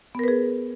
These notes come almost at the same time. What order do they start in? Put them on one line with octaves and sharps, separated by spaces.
B3 A#4 B4 G#4